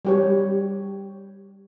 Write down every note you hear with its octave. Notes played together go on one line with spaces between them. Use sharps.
G3 G4 C#5